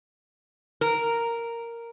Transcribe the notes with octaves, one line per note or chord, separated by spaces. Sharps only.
A#4